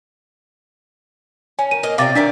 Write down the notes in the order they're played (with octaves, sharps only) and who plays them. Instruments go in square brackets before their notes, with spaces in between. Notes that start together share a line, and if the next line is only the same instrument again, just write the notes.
[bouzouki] C#4 [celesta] G#5
[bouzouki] D#3 [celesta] D#7
[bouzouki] A#3 D#5
[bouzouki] C3 F4 D5 [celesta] F5 D6 A6
[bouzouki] D#3 D5 E5 [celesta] D4 B6